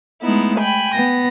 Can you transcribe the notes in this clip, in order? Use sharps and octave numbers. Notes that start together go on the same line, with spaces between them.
G#3 A3 B3 D#4 E4
G5 G#5 B5
B3 A#6